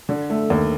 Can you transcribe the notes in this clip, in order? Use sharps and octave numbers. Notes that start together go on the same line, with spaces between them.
D3
A3
D#2